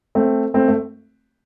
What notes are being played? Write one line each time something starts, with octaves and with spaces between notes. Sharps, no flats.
A3 C4
A3 C4
A3